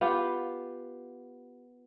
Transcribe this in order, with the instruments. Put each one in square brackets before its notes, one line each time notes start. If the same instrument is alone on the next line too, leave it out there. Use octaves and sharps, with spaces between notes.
[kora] B3 F4 G4